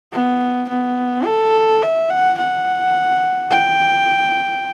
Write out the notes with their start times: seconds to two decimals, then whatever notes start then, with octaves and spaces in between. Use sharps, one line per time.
0.12 B3
0.69 B3
1.25 A4
1.82 E5
2.10 F#5
2.38 F#5
3.51 G5